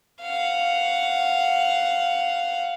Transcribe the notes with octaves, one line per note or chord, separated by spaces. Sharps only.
F5 F#5